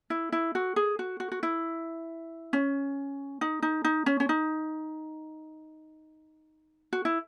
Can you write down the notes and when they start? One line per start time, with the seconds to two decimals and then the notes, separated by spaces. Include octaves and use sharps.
0.10 E4
0.32 E4
0.55 F#4
0.76 G#4
0.99 F#4
1.20 F#4
1.32 F#4
1.43 E4
2.53 C#4
3.41 D#4
3.62 D#4
3.84 D#4
4.06 C#4
4.20 C#4
4.29 D#4
6.93 F#4
7.05 E4